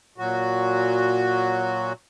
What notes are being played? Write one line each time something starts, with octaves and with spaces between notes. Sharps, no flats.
A#2 F#3 F#4